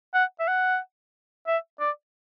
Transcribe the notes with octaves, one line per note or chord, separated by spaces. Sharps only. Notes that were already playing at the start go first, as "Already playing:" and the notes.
F#5
E5
F#5
E5
D5